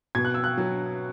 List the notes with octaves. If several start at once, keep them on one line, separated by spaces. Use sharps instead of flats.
B2 G#6
F#6
E6
F#6
F#3